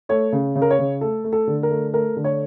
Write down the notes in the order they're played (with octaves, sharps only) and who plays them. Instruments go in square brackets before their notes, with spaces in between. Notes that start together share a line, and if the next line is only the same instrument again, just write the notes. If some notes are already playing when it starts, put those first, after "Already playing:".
[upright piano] A3 C#5
C#3
C#3
A#4
C#5
C#3
A3 A4
A3
A4
D3
A#4
A3
A3 A#4
D3
C#5